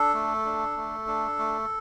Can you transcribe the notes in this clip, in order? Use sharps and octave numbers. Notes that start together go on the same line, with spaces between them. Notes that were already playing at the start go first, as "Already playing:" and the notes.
Already playing: D4 A4
A3
D4
A3
D4
A3